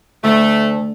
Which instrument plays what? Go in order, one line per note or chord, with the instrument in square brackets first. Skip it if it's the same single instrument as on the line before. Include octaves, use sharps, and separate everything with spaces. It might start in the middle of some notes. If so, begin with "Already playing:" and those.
[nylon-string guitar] D2 [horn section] A3